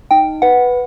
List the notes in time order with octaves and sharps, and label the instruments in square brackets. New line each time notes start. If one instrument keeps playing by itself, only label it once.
[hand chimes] D#4 [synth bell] G5
[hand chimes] B4 [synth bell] F#5